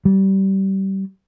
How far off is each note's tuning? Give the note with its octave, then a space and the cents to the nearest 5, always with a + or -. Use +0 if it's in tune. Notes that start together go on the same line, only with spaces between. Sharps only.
G3 -25